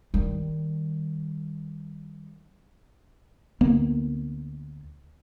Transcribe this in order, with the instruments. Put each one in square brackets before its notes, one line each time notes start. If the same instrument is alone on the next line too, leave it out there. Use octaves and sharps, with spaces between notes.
[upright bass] D#3 G3
[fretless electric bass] D2 A#3 B3